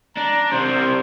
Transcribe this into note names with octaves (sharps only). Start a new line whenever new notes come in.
D4 A#5
C3 G3 C5